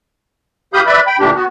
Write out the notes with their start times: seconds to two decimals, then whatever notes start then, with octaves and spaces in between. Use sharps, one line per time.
0.74 E3 G4 F5 B5 D#6 G6
0.87 B4 D5 E5 B5
1.07 G5 B5
1.19 D2 A#2 E3 D4 G4
1.35 B3 F#4